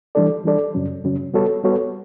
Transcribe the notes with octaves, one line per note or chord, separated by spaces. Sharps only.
E3 G3 D4 A4 D5
E3 G3 D4 A4 D5
F#2 C#3 F#3 C#4
F#2 C#3 F#3 C#4
G3 B3 F#4 A4 C#5
G3 B3 F#4 A4 C#5